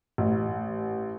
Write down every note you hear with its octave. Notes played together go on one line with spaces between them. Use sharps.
A1